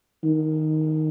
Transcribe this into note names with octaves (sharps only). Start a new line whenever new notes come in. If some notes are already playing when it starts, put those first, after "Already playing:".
D#3